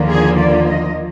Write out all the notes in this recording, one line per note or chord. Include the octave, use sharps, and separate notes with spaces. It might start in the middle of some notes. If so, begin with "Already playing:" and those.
Already playing: D#2 D3 F3 A#3 F4
G#4
D5
D#5